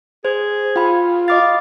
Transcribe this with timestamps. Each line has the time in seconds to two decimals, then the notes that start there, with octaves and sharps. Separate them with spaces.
0.25 G#4 C5
0.76 F4 G5 B5
1.28 D#5 F5 D6 A6